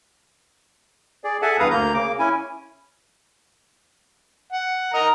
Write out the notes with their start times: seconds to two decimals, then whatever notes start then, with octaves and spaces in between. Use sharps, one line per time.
1.24 G#4 D5
1.42 G#4 A4 E5 F#5 G#5 A5
1.59 E2 G2 B4 F5 A#5 D#6
1.71 D2 A#3 A#5 G6
1.94 C#3 A#3 D6
2.19 C#4 E4 G#5
4.52 F#5
4.94 A#4 D#5 A#5